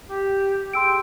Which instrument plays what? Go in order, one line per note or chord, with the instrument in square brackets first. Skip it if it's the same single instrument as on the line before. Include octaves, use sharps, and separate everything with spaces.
[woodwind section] G4
[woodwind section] G4 G#4 G5 [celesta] C6 E6 D7